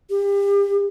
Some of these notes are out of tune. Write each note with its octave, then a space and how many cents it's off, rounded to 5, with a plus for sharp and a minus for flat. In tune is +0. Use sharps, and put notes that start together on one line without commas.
G4 +35